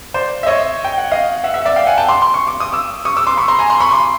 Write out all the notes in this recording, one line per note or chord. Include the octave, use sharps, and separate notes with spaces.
C5 D5
E5
C#5 D#5
G5
F#5
D#5 F5
E5 F#5
E5 F#5
D5 E5
F5 G5
F#5 G#5
G5 A5
C6 D6
C6
C#6
D6
D#6
D6 E6
C#6 D#6
D6 E6
C6 D6
B5 C#6
A#5 C6
G#5 A#5
A#5 C6
B5 C#6
C6 D6